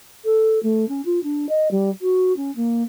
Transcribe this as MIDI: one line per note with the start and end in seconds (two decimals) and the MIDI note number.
0.25 0.59 69
0.63 0.88 57
0.89 1.01 61
1.05 1.22 65
1.23 1.46 62
1.49 1.68 75
1.71 1.90 55
2.02 2.35 66
2.37 2.54 61
2.56 2.83 58